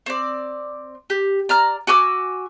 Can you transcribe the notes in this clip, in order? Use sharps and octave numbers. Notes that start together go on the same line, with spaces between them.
C4 D5
G4
D5 A#5 F6
F#4 G#5 D6 E6